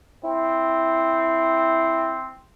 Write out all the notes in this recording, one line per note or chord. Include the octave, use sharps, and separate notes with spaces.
C4 E4